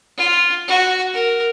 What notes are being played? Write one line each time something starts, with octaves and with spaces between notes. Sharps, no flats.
F4
F#4
A#4